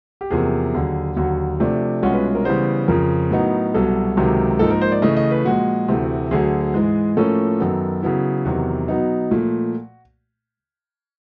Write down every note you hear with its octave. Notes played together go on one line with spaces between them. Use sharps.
G4
E2 C3 F3 A#3 G#4
D#2 D3 F#3
D#2 D3 F#3 F#4
C3 F3 A3 D4
C2 B2 G#3 C#4 F4 F#4
B4
A#4
C#3 E3 G3 B3 C5
F2 C#3 F3 A#4
A2 F#3 B3 D#4
C2 B2 F#3 A4
C#2 C3 D#3 F#3
G#2 F3 A#3 D#4 A4
A#4
C5
D5
C#3 E3 A3 D#5
D#5
B4
A#2 F3 G#3 F#4
D2 C3 E3 A3
D2 D3 F#3 G#4
G#2 E3 G#3
A2 F3 A#3 C#4 F4 A4
F#2 D#3 F#3 B3
C#3 F#3 B3 E4
E2 C3 D#3 F#3 F#4
B2 F#3 B3 D#4
A#2 F3 A3